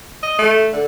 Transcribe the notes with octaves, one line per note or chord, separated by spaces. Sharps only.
D#5
A3
D3